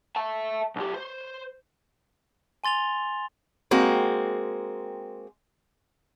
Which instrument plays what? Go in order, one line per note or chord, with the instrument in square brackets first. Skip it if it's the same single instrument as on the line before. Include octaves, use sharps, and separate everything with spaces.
[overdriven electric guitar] E5 A5
B1 G4
C5
[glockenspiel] G#5 C6 A6 F7 G7
[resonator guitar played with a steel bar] G#3 A#3 C4 F#4